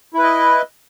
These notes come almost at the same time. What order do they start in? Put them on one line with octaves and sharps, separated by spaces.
E4 B4 D#5